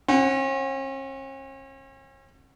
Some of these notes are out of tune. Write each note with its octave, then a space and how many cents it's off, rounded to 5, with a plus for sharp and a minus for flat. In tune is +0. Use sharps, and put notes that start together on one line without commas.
C#4 -45 F#5 +0